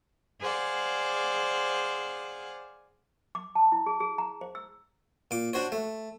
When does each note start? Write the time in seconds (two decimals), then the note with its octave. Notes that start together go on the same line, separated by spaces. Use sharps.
0.41 G#4 C5 D5 F5 F#5
3.35 D6
3.55 A5
3.72 E4
3.86 G#4
4.00 G#4
4.18 A#5
4.41 C5
4.55 E6
5.31 A#2 D6
5.53 D4 F#4 C5 C#5
5.72 A3